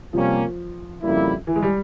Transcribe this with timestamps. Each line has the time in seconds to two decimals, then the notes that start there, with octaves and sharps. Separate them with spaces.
0.12 C3 F3 G3 A#3 C#4
1.03 F2 C#3 G3 A#3 E4
1.47 E3
1.56 G#3
1.63 G3